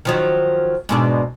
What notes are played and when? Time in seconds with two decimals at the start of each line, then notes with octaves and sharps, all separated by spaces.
0.05 D#3 F3 F#3
0.89 G#2 B2 D4